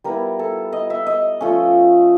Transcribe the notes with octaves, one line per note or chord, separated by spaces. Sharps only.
G3 B3 E4 A#4
A4
D#5
E5
D#5
F3 A3 C#4